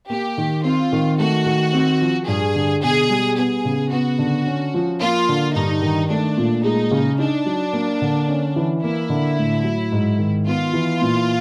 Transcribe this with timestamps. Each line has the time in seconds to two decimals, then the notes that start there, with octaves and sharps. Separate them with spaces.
0.10 A#3 G4
0.38 D#3
0.64 C4 F4
0.92 D#3
1.19 A3 F#4
1.46 D#3
1.73 C4
2.01 F3
2.28 G2 G#4
2.55 D3
2.83 B2 G#4
3.09 G3
3.37 B3 G#4
3.65 C#3
3.91 B3 F#4
4.18 D3
4.46 C#4
4.74 F3
5.01 A#3 F4
5.29 D3
5.55 G2 D#4
5.82 D#3
6.10 A3 D4
6.37 A#2
6.64 G#3 D#4
6.91 C#3
7.19 D4 D#4
7.46 F#3
7.73 A#3
8.01 D3
8.28 C#4
8.56 E3
8.83 A#3 E4
9.09 D3
9.37 A2
9.64 F#3
9.92 G#2
10.19 D#3
10.47 B3 F4
10.73 E3
11.01 A#2